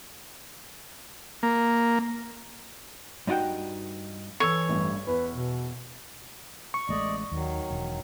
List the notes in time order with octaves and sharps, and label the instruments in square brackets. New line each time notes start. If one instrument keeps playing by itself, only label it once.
[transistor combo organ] A#3
[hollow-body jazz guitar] G2 D#4 F4 F#4 G5
[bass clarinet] E3 [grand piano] A4 E6 [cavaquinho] C#5
[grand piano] A1 G2
[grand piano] E2 [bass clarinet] B4
[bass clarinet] B2
[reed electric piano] C#6
[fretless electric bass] A1 G#3 A3 [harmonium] D5 D#5
[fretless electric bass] D#2 [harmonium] D#3 F#3
[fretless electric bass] E1